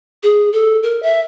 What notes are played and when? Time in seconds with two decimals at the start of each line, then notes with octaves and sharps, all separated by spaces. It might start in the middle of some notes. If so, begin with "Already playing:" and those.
0.23 G#4
0.53 A4
0.83 A#4
1.03 E5